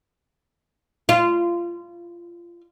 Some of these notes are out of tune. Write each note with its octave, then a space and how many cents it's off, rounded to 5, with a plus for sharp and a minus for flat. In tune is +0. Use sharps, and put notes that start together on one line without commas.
F4 -20